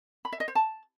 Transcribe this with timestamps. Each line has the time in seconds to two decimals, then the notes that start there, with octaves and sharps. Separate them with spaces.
0.25 B5
0.32 E5
0.40 D#5
0.48 C5
0.55 A5